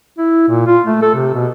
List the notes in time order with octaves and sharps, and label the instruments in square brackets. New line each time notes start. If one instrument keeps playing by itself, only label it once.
[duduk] E4
A#2
F4
A3
A4
C3
B2